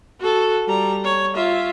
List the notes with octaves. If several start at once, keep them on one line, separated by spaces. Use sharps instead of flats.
F#4 A4
G3 A#5
C#5
F4 E5